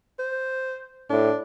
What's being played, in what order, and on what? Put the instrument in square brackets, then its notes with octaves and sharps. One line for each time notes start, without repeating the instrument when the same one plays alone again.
[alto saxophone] C5
[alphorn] A2 [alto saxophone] D4